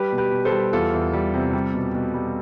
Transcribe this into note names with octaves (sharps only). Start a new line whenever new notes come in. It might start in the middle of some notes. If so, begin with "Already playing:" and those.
Already playing: G3 G4 B4
B2
G4 B4
B2
A4 C5
G3
E2 F4 A4
E2
G3
C3
G3
B2
B2
G3